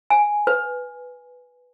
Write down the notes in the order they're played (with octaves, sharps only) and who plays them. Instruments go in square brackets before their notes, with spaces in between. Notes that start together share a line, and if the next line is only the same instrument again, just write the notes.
[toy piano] G#5
B4